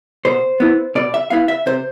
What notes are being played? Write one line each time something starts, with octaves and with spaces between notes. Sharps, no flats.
B2 C5
B3 E4
B2 D5
E5
B3 E4 F5
E5
C3 C5